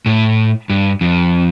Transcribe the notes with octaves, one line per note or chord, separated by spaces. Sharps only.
A2
G2
F2